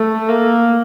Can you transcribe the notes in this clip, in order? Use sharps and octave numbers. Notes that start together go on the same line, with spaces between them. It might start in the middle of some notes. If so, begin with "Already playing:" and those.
Already playing: A3
A#3